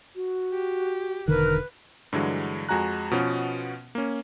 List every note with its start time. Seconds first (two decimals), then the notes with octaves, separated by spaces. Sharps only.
0.16 F#4
0.52 G4
1.28 E1 D3 D#3 A#4 B4 F#6
2.12 G2 D3 E3 F#3 G#3
2.69 F2 G#3 F#4 G#5 A#5 F#6
3.11 B2 F3 B3 C#4 F4 F#4
3.95 A#3 C#4